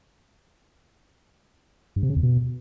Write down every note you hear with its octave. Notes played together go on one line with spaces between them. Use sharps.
G2
C3
C#3
E2
B2